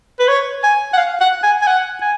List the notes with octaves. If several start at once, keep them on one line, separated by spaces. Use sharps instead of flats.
B4
C#5
G#5
F#5
F5
F#5
G#5
G#5
F#5
G#5